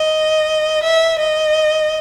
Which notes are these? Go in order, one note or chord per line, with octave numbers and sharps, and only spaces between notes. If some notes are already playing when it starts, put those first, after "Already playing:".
Already playing: D#5
E5
D#5